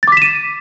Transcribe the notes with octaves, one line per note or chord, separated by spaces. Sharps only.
D6 A6 B6 D#7 E7